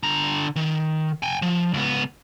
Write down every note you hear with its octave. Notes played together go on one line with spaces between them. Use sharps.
D3 A#5
D#3
G5 G#5
F3
C#2 B3